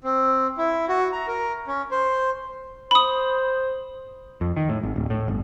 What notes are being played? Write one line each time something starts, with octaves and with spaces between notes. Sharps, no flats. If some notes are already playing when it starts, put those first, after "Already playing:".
C4
E4
F#4
A#5
A#4
C#4
C5
C5 B5 D#6
F2
D#3
A2
G#1
D1
A2
G1